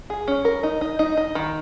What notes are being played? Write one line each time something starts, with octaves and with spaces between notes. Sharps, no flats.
G#4
C#4
A#4
D#4
D#4
D#4
D#4
D#3